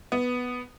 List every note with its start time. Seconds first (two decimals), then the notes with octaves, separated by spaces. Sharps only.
0.12 B3